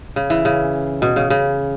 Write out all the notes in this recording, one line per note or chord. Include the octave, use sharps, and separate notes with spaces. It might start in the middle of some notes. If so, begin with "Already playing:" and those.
C#3
E3
C#3
B2
C#3
C#3